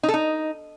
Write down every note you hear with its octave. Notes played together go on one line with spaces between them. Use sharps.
D#4
A4
D#4